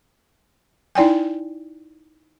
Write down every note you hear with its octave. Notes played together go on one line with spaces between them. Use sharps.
D#4 E4 D5 G5 G#5